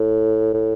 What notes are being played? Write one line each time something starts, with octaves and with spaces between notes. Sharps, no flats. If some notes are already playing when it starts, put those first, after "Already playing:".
Already playing: A2
A2